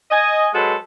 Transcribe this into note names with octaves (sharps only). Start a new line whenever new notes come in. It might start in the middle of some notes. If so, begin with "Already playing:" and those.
D#5 G#5
F#3 G#3 F#4 A4 B4 C5